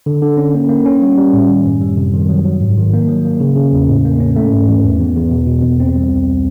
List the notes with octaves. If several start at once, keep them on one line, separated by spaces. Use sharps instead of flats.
D3
D3
C#4
A#3
A#3
C#4
G3
G3
A2
D#3
F#2
G3
C3
D#3
F#3
F#3
G#2
D#3
A#3
F#3
A#3
C#3
C#3
E2
A2
A#3
C#4
A3
G#2
E3
E2
E2
E2
B2
B2
E2
C4
G3
C2